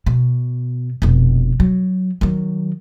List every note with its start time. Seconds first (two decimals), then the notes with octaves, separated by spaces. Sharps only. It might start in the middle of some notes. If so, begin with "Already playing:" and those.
0.06 B2
1.02 F1 B2
1.60 F#3
2.21 D#3 F#3